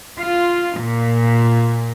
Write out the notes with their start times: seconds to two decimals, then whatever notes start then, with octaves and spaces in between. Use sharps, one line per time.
0.21 F4
0.78 A#2